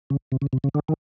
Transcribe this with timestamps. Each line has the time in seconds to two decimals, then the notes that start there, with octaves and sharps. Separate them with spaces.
0.10 C#3
0.32 C3
0.42 C#3
0.53 C3
0.64 C#3
0.75 D3
0.89 D#3